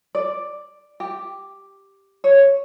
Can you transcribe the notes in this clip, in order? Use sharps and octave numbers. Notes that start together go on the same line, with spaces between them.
D5
G4
C#5